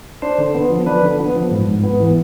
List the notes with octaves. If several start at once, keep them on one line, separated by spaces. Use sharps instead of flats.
D4 C5
D3
B3
F3
D4 B4
D3
B3
F3
G#2
G#2
B3
E3